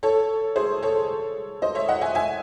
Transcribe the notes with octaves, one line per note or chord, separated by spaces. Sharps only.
A4 C#5
G#4 C5
A4 C#5
C5 D#5
C#5 E5
D#5 F#5
E5 G#5
E5 G#5